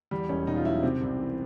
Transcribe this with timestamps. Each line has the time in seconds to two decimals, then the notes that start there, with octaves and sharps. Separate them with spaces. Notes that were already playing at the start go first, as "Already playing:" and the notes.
0.11 E2 G3
0.29 E1 C#4
0.47 B2 D#4
0.56 F4
0.65 F#3 E4
0.83 C3 C4
1.01 C2
1.19 E3